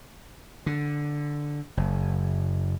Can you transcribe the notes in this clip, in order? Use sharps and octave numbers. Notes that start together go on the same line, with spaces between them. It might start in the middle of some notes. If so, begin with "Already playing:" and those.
D3
F#1